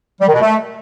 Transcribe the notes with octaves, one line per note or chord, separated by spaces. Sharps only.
G3
D#3
B2
A3